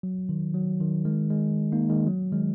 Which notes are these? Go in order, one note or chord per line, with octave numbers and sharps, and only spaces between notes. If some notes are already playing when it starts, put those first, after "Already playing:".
F#3
D#3
F#3
D#3
D#3 G#3
D#3 G#3
A#3 D#4
D#3 G#3
F#3
D#3 G#3